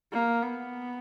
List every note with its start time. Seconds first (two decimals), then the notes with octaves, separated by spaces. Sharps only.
0.13 A#3
0.43 B3